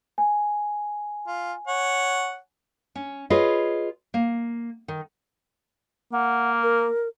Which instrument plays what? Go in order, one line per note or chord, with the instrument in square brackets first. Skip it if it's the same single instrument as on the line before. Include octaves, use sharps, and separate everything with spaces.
[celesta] G#5
[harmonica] F4
C#5 F#5
[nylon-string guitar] C#4
F4 G#4 B4 C#5 D#5
A#3
D#3
[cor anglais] A#3 [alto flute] F#5
[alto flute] A#4